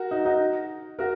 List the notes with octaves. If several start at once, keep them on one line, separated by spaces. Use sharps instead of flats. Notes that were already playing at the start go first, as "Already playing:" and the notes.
Already playing: F#4 A#4
D#4
D#4 F#4
F#4 A#4